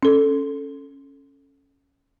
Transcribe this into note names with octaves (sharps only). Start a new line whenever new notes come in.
C#4 A4